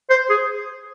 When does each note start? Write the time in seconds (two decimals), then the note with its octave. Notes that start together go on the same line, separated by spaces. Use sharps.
0.10 C5
0.30 G#4